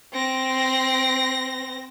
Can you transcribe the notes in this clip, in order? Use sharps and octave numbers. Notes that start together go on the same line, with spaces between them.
C4 A#6